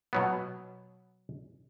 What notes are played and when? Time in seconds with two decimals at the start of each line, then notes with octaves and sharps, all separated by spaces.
0.13 B2 F#3 B3